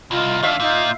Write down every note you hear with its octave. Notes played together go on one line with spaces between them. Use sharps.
C2 F4 D#5
D#3 D4 E5 F5
A#2 D#4 F4 G6